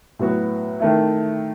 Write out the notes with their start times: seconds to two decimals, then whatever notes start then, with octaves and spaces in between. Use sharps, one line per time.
0.19 A2 F#3 B3 F#4
0.80 D#3 A3 E4